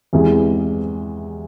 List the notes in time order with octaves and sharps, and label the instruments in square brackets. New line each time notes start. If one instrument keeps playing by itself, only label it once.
[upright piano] E2 C3 E3 G#3